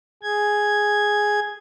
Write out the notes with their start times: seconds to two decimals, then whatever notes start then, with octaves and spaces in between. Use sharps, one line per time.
0.23 G#4 G#6